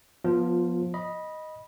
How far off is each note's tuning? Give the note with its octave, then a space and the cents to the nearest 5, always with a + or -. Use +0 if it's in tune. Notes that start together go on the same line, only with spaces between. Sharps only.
F3 +20 B3 -15 F4 +0
D#5 +0 B5 -15